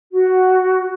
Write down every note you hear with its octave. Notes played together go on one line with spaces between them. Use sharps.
F#4